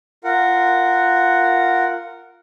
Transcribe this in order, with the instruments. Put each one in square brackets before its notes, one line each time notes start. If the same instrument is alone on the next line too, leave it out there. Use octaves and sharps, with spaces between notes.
[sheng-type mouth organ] F4 A#4 F#5